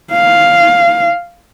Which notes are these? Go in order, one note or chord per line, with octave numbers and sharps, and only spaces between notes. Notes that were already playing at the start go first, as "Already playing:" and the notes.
F5